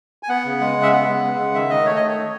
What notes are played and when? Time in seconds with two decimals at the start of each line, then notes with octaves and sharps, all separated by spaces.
0.23 G#5
0.29 B3 F#5
0.45 C#3
0.60 G#3
0.76 C#3
0.83 E5
0.92 B3 F#5
1.08 C#3
1.23 G#3
1.38 C#3
1.54 D#3 E5
1.70 D#3 D#5
1.86 A3 C#5
1.96 D#5
2.02 A3
2.08 C#5
2.18 D#3